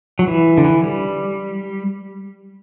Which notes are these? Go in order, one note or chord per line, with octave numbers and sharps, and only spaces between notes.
F#3
E3
D3
E3
G3